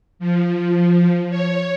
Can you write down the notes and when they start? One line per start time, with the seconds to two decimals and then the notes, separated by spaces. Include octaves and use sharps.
0.19 F3
1.30 C#5